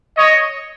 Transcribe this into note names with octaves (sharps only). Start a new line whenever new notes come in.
C#5 D#5